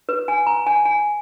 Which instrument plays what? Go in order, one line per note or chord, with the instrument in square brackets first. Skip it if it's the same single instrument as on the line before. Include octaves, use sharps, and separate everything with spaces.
[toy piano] B4
G#5
A#5
G#5
G#5